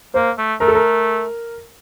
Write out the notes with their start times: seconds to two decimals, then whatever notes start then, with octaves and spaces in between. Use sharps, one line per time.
0.14 A#3 C5
0.38 A3
0.60 A3 A#4
0.68 A4
0.75 A#4